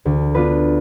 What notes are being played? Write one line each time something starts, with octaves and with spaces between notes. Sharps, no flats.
D2
B3 D4 F4 B4